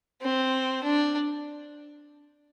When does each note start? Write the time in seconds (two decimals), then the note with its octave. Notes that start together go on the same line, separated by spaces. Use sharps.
0.22 C4
0.84 D4